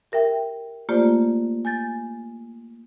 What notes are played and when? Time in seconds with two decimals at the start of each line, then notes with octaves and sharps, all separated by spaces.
0.12 G4 A#4 E5 G5
0.89 A3 A#3 F4 G4 C5 D5
1.65 G#5 G6 A6